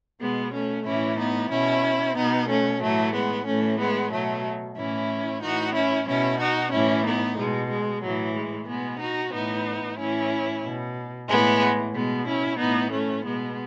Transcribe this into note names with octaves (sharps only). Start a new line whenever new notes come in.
B2 G#3 B3
A3 C#4
A2 E3 C#4 E4
B3 D#4
B2 C#4 E4
B2 B3 D#4
A3 C#4
A2 E3 F#3 A3
G#3 B3
A2 E3 A3 C#4
G#3 B3
B2 F#3 A3
A2 E3 C#4 E4
A2 E3 D#4 F#4
C#4 E4
B2 C#4 E4
D#4 F#4
A2 E3 C#4 E4
B3 D#4
B2 G#3
G#3
A2 E3 F#3
G#3
B2 G#3 B3
D#4 F#4
A2 E3 B3 D#4
A2 E3 C#4 E4
B2
A2 E3 G#3 B3
B2 G#3 B3
C#4 E4
A2 E3 B3 D#4
A3 C#4
B2 G#3 B3